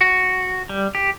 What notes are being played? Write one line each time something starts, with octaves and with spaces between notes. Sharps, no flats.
F#4
G3
G4